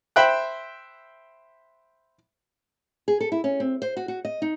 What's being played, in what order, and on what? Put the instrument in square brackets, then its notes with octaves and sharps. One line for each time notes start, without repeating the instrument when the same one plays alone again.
[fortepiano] C5 E5 G5 B5 F#6
[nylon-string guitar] G#4
A4
E4
C#4
C4
C5
F#4
F#4
D#5
D#4